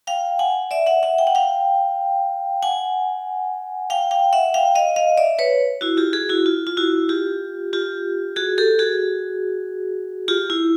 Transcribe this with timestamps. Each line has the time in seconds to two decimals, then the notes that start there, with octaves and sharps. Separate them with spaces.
0.07 F5 G5
0.39 F#5 G#5
0.71 D5 E5
0.87 E5 F#5
1.03 E5 F#5
1.18 G5
1.27 F#5
1.35 F5 G5
2.62 F#5 G#5
3.90 F5 G5
4.11 F5 G5
4.33 E5 F#5
4.54 F5 G5
4.75 D#5 F5
4.96 D#5 F5
5.18 D5 E5
5.39 B4 C#5
5.81 E4 F#4
5.97 F4 G4
6.13 F#4 G#4
6.29 E4 F#4
6.46 F4
6.67 F4
6.77 E4 F#4
7.09 F4 G4
7.73 F4 G4
8.36 F#4 G#4
8.58 G4 A4
8.79 F#4 G#4
10.28 F4 G4
10.50 E4